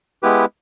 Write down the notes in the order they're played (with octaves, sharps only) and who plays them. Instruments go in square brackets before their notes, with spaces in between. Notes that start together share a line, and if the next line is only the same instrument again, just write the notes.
[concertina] G#3 B3 E4 G4 B4